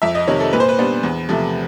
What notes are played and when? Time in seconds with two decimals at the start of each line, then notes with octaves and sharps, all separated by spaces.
0.02 F2 E5
0.15 D#5
0.27 C3 D#3 C#5
0.40 A4
0.53 A#2 B4
0.60 C5
0.69 B4
0.79 G3 B3 D4
1.03 E2
1.29 C3 F3 A3